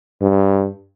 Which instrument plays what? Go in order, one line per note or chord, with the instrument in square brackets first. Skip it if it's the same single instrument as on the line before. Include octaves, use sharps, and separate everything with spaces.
[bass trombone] G2